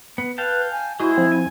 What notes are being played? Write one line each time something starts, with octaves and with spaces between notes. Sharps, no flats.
B3
B4 F5 G5 A5
G#5
G#3 E4 F#4 G#4 C5
F3 C4
G#5